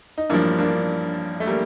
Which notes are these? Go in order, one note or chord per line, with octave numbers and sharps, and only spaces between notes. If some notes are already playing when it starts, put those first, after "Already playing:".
D#4
A1 G2 F3 A#3 D4
A#3 D4
A3
G3 A#3